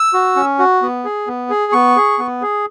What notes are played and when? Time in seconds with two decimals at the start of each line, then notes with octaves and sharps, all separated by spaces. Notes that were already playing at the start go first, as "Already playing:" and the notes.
Already playing: E6
0.13 F#4
0.36 C#4
0.59 F#4
0.82 B3
1.05 G#4
1.27 B3
1.50 G#4
1.72 B3 C#6
1.96 G#4
2.19 B3
2.42 G#4